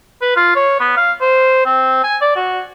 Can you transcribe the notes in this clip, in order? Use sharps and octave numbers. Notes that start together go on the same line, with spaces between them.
B4
F4
C#5
B3
F5
C5
C4
G#5
D5
F#4